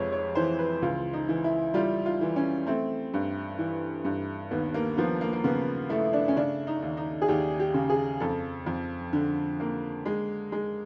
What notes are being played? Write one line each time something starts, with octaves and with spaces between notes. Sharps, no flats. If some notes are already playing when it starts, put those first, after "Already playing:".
Already playing: F2 C3 G#3 B4 C#5
C#5
E3 C5
B4
C#2 F4
D#4
E3
E4
G3 F4
F4
E3
C#4
A3 C4
G2
E3
G2
D#2 B3
A#3
F3 B3
A#3
A#3
C#3 B3
A3 E4
D4
C#4
C#3 D4
D#4
D#2
D#4
G#4
D#2 G4
G4
C#3
G#4
F2 A4
F2
D3
A#3
G#3
G#3